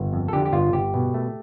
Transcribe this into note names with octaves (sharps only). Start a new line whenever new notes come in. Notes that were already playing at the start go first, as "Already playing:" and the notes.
Already playing: G1
F2
A4
D3 G4
G4
G1 F4
G1 G4
B2
A3